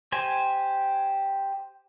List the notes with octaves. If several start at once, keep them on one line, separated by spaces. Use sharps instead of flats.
G4 C5 G#5